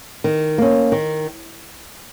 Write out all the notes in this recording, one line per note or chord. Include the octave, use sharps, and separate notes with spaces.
D#3
A#3 C#4
D#3